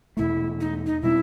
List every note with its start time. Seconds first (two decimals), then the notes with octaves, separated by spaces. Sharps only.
0.17 E2 B2 A3 E4
0.60 D#4
0.86 D#4
1.02 B2 G3 C4 E4